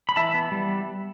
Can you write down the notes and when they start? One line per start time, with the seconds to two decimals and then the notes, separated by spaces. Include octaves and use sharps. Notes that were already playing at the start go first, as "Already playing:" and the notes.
0.09 B5
0.16 E3 E5 A5
0.34 B3
0.52 G3